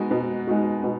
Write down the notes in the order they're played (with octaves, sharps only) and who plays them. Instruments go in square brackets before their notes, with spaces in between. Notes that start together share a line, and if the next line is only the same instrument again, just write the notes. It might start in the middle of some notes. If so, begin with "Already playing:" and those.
Already playing: [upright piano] B2 G#3 D#4 F#4
B2
G#3 D#4 F#4
B2